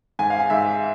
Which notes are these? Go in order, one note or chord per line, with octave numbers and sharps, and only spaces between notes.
G#2 G#5
F5
G#5
G#2 E5